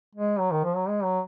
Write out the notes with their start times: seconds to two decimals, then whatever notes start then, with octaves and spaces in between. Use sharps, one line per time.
0.16 G#3
0.39 F#3
0.51 D#3
0.64 F3
0.76 F#3
0.89 G#3
1.04 F#3